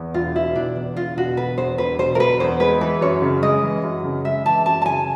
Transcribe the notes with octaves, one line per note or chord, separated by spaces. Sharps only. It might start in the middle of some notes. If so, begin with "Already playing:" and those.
Already playing: E2
E1 F4
B2 E4
E1 D4
E2
E1 F4
B2 F#4
E1 B4
E2 C5
E1 B4
B2 C5
A#4
E1 B4
E2 C5
G#3 B4
E3 B4
F#2 C#5
C#3
G#3 D#5
E3
F#2
C#3
G#3 E5
E3 A5
F#2 A5
A5
C#3 G#5